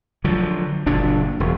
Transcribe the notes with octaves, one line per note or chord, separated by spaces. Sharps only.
D3 F3 F#3
F#1 A#2 D4
E1